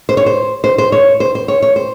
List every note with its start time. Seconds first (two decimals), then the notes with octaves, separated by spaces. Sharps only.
0.09 C5
0.17 C#5
0.26 C5
0.64 C5
0.78 C5
0.92 C#5
1.20 C5
1.35 C5
1.48 C#5
1.62 C#5
1.76 C5